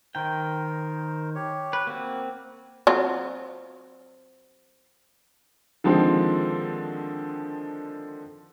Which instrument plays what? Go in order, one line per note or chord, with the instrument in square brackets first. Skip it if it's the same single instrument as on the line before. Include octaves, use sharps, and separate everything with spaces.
[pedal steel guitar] D#3 G5 [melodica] A#4 C5
[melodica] G4 C#5
[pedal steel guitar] B4
[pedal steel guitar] A#3 C4 [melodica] F#4
[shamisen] F#3 C4 F4
[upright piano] D3 D#3 F3 G#3 C4